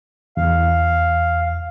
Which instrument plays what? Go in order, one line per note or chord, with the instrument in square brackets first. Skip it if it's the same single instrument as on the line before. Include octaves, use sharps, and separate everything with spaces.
[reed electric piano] E2 [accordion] F5